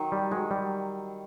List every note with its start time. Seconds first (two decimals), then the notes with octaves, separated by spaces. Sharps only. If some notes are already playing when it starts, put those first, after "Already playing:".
Already playing: D#3 F#3
0.12 G3
0.31 F#3 G#3
0.51 G3